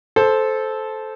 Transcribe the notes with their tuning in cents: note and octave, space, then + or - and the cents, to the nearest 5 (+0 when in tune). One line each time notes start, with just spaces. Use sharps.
A4 -15 C5 +0